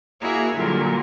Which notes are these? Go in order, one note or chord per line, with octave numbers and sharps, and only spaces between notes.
A#3 E4 F#4 G#4 C#5
G2 A#2 D3 F#3